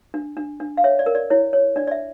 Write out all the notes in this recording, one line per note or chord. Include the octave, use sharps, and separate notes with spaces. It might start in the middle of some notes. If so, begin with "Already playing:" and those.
D4
D4
D4
F5
C#5 E5
D5
A#4
D5
E4 C#5
C#5
D4 D5
D5
E5